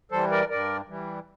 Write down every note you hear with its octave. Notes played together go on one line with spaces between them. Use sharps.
E3 G3 A4 C5
A#4 D5
G2 A#4 D5
E3 G3